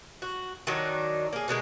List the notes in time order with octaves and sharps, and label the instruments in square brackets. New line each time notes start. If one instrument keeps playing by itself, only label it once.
[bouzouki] F#4
D#3 F#3 D4 D#4
A#3 G#4
B2 D3 G#3 A#4